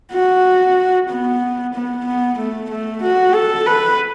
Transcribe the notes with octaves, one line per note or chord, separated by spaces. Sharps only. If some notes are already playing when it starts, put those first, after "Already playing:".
F#4
B3
B3
B3
A3
A3
F#4
A4
B4